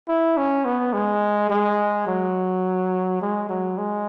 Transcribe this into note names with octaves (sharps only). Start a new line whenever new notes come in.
E4
C#4
B3
G#3
G#3
F#3
G#3
F#3
G#3